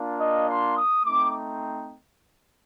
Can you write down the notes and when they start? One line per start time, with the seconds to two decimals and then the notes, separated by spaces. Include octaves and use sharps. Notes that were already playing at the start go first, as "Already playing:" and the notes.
Already playing: A#3 D4 F4
0.18 D#5
0.47 C6
0.75 D#6
1.05 A3 C4 D#4 D6